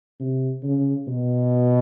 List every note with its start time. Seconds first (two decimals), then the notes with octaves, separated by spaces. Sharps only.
0.20 C3
0.63 C#3
1.07 B2